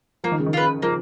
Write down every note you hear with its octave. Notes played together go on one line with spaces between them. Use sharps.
F3 A#3
D#3
C#3
D#3
F4 B4
F3 A#3